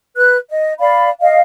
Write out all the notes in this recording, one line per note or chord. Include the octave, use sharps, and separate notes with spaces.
B4 F#6
D#5
D5 F5 B5
D#5 F5